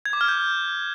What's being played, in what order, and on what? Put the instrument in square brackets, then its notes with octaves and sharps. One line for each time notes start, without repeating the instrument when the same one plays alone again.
[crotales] G#6
D6
F6
G6